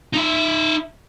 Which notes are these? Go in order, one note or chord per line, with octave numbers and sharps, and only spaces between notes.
D#4 E5